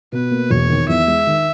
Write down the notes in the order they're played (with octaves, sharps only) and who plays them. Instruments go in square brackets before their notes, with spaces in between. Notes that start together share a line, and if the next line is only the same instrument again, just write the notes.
[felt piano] B2 [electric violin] B4
[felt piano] A#3
[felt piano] E1 [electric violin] C#5
[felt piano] D#3
[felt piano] E2 [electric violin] E5
[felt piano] G#3
D#3